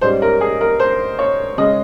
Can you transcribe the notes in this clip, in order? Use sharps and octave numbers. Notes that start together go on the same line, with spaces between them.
G#2 G3 C#4 C5
A#4
G#4
A#4
C5
C#5
C#3 G#3 C#4 D#5